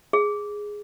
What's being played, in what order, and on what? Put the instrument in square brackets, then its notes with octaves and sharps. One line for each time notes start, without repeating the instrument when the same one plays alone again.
[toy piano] G#4